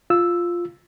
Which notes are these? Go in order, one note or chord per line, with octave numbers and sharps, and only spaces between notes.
F4 E6